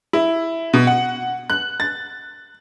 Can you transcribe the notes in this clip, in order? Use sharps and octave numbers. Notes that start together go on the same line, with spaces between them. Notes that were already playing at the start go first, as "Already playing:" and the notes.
E4
B2
F#5
F#6
A6